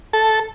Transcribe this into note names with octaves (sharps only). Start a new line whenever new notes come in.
A4